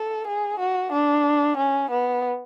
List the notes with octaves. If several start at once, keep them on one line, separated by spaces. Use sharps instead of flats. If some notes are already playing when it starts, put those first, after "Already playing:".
Already playing: A4
G#4
F#4
D4
C#4
B3